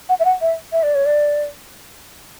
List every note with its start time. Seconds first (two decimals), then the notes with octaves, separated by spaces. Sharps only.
0.09 F#5
0.20 E5
0.25 F#5
0.41 E5
0.72 E5
0.83 D5
0.95 C#5
1.06 D5